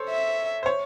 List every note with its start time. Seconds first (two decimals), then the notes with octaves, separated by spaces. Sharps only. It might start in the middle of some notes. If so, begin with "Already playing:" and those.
Already playing: A4 C5 C#5
0.10 E5
0.63 C5
0.66 C#5